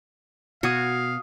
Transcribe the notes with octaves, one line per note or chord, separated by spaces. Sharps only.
B2 F#4 F5 D#6 G#6 C#7